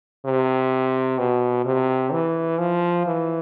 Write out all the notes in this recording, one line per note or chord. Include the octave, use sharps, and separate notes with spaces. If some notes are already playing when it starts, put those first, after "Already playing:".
C3
B2
C3
E3
F3
E3